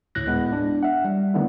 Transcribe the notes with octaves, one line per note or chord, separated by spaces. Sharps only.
D2 A2 F#6 A#6
G#3 B3 E4
D4
E5 F#5
G3
D3 D#3 A3 B3 D4 E4